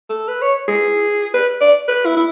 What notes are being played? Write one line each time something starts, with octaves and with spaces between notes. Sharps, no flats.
A4
B4
C#5
G#4
B4
D5
B4
E4
E4